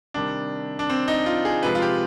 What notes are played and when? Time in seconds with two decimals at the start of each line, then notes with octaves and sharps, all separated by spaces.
0.14 C3 D#3 G3 D4
0.79 D4
0.90 C4
1.08 D#4
1.26 F4
1.45 G#4
1.63 C3 F3 G#3 B4
1.75 F4
1.82 G4